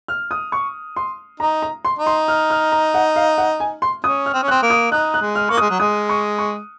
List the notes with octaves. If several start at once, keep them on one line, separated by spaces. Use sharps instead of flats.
F6
D#6
C#6
C6
D#4 A#5
A#5
C6
D#4
C6
F6
F6
A#5
F#5
F5
F#5
G#5
C6
C#4 D#6
F6
C4
C#4
F#6
C4
A#3
D#6
D#4 F#6
F#6
G#3
F6
A#3 C#6
D#6
G#3
F#3
G#3 D#6
C#6
C#6